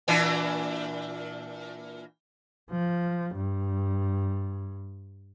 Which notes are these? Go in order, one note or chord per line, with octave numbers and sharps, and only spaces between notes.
A#2 E3 D4
F3
G2